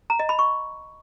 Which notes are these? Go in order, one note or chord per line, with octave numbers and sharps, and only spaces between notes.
A#5
D#5
B5
C#6